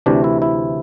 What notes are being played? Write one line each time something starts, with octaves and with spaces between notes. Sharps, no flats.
D2 C3 E3 D4
E4
E4